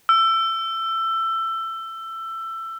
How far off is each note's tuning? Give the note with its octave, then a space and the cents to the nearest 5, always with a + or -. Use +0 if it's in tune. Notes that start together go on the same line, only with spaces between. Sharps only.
E6 +20